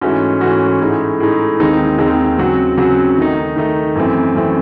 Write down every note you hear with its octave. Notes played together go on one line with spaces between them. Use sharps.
G#2 E3 A3 C#4 F#4
G#2 E3 A3 C#4 F#4
A2 G#3 D#4
A2 G#3 D#4
D#2 D#3 G#3 C4 D#4
D#2 D#3 G#3 C4 D#4
C#3 F#3 C4 F#4
C#3 F#3 C4 F#4
D#3 A3 D#4
D#3 A3 D#4
F#2 E3 A3 C4
F#2 E3 A3 C4